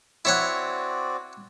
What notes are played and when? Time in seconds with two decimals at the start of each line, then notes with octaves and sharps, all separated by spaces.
0.25 C4 E4 F#4 C#5 D5 F#5